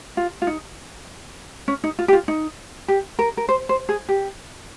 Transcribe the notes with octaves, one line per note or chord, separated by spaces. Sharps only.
F4
F4
D#4
C#4
D#4
F4
G4
F4
D#4
G4
A#4
A#4
C5
C5
G#4
G4